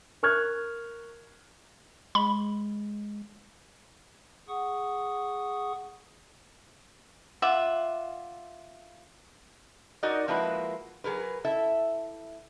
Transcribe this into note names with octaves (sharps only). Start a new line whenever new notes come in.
A#4 C#6 F6 F#6 G#6
G#3 B5
G#4 F#5 C#6 D#6
F4 E5 F#5 D6
D#4 F#4 A#4 D5 D#5
F3 G#3 A#3 E4 F#4 B4
F#3 G#4 A#4 B4
E4 A4 E5